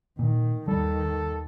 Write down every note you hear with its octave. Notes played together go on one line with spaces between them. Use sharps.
A#2 D#3
D#2 D#3 G3 A4